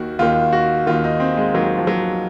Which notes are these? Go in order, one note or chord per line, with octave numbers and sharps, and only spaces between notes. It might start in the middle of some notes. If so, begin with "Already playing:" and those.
Already playing: D#2 D#3 F#4
D#2 D#3 F4
F#4
D#2 D#3 F4
D#4
C4
G#3
D#2 D#3 F#3
F3
F#3